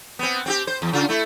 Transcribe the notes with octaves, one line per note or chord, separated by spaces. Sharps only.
B3 C4
C4 F#4 G4
C5
E2
C#3 F4
A3 E4